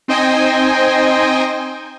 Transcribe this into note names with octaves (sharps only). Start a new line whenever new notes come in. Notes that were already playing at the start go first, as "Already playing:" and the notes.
C4 D#4 C5 D#5 G5 G#5